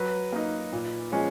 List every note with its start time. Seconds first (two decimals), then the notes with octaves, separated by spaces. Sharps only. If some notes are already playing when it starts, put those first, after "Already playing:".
Already playing: F#3 B4
0.32 A#3 D#4
0.72 A#2
1.12 F3 G#3 C#4